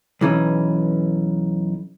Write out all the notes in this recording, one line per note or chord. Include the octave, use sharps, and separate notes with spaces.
B1 E3 C#4